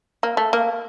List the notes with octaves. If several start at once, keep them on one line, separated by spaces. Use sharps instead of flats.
A#3
A3
A#3